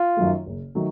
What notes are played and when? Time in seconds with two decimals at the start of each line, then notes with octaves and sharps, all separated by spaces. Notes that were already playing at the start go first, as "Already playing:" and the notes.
Already playing: F4
0.17 F#2 D#3 F#3 A3
0.46 F#1
0.75 D#3 F#3 A3